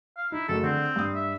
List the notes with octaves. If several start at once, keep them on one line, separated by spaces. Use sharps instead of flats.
F5
D#4 E4
F#1 A3 F#4 A4
D3 C4
G2 D#6
E5